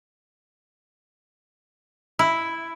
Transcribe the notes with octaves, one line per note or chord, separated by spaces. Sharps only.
E4